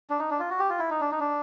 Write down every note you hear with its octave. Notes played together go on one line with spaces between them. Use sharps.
D4
D#4
D4
F4
F#4
G4
F4
E4
D#4
D4
D#4
D4